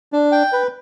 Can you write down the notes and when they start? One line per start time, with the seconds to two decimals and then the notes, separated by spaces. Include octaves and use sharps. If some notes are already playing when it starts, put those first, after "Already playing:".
0.13 D4
0.32 G5
0.53 B4